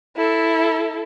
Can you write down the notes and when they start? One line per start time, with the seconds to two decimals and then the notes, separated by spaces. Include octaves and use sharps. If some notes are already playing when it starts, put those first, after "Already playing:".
0.17 E4 A4